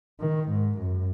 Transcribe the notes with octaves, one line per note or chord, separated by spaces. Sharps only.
D#3
G#2
F#2